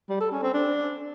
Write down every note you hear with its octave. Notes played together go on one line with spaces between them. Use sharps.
G3
A4
C#4
C4
D4